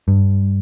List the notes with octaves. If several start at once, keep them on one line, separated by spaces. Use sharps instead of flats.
G2